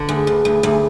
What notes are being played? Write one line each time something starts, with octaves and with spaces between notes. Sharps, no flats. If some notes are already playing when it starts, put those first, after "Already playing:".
Already playing: D3 B4
D2 G#4
D2
B4
D2
G#4
D2 G4
G#4